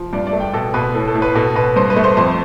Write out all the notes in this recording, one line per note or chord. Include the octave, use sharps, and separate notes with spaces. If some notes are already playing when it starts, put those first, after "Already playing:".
Already playing: F3
G2 D5
D5
A3
G5
B2 A4
B2 B4
A2 A4
A4
A2
B4
B2 A4
B2 B4
G2 C5
B4
A3
C5
F2 C5